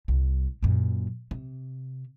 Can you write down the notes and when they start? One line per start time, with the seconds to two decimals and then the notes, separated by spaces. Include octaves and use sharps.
0.08 C2
0.63 F#2 A#2
1.31 C3